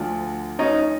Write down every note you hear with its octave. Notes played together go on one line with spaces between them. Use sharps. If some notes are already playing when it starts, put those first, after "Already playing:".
Already playing: D2 D3 F3
C#4 D#4